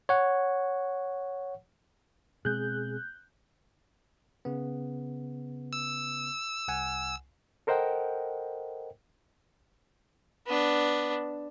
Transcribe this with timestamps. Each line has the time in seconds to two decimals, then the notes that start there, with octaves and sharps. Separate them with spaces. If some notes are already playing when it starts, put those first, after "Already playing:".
0.09 C#5 F#5
2.45 B2 G#3 C4 G#4 F#6 G6
4.45 C#3 B3
5.73 E6
6.68 C2 F#5 G#5
7.67 A4 A#4 C5 D#5 F#5 G5
10.46 B3 D4